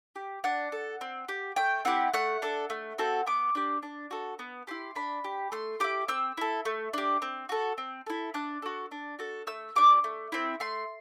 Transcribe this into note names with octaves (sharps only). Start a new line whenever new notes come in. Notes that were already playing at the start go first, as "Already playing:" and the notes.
G4
D4 F#5
A4
C4
G4
A3 G5
C4 E4 G4 F#5
A3 F#5
D4 A4
A3
C4 F#4 A4
B3 D6
D4 G4
D4
F#4 A4
B3
E4 G4 C6
D4 B5
G4
A3 C6
E4 G4 D6
C4 E6
E4 A4
A3
D4 G4
C4
F#4 A4
C4
E4 A4
D4 F#6
F#4 A4
D4
F#4 A4
A3 E6
D4 G4 D6
A3
C4 E4
A3 C6